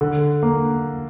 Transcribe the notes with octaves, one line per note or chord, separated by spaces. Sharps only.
D3
A#3